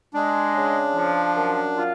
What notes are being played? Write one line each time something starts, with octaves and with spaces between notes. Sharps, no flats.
G#3 D4
C#3
F3
F#2
F4